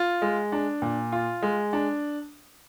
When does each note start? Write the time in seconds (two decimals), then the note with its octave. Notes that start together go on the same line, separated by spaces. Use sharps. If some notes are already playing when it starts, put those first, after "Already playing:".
Already playing: F4
0.22 G#3
0.52 D4
0.82 A#2
1.12 F4
1.42 G#3
1.73 D4